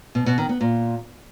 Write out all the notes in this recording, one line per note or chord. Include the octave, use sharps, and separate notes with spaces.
B2
B2
D#3
B3
A#2